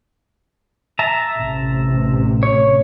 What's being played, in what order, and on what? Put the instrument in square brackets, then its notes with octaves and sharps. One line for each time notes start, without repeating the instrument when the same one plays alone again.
[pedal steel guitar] E5 A5 A#5
[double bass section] A1 C3
[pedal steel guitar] C#5